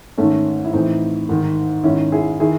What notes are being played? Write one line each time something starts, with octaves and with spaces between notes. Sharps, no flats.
G#2 D#3 A3 C#4
E4
A2 E3 C4 D#4
G#2 D#3
G#2 D#3 C#4 E4
E4 G#4
D#3 E4 G#4